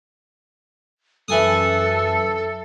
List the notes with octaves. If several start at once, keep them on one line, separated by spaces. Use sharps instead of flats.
F#2 E3 A4 G#5 D#6